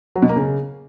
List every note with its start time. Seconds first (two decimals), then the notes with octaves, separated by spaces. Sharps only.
0.16 F#3
0.22 B2
0.29 A#3
0.36 C#3